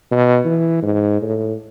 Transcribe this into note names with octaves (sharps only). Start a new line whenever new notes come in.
B2
E3
G#2
A2